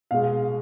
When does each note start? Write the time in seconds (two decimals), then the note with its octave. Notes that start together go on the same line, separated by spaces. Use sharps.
0.11 B2 G#3 F5